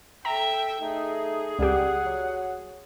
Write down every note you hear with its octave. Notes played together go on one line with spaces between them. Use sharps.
A4 E5 G5 A#5
A3 D#4 G#4
C#2 G3 G4 F#5
F#3